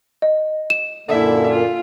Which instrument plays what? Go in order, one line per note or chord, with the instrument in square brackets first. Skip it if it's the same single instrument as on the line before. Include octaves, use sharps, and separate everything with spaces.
[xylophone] D#5
E7
[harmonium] F#2 A#2 A#3 [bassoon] D3 [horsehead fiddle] E4 E5
[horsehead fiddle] F4